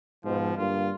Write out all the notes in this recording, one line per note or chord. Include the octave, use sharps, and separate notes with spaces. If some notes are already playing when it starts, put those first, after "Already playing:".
G#2 B2 F3
G2 D3 A#3 F4